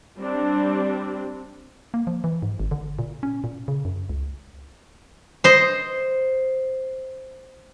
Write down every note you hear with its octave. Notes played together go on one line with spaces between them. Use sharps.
G3 C4 D4
A#3
F3
E3
G#2
G#1
D3
A#2
C#4
A#2
C#3
F#2
C#2
C5 D#5